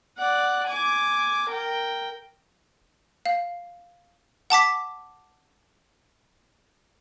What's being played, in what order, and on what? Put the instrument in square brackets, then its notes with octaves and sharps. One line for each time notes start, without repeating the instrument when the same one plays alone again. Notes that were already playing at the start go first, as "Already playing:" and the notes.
[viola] D5 F#5
G#5 D6
A#4 G5
[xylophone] F5
F#5 A5 D6 B6